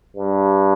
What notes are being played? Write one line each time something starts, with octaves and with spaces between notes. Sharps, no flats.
G2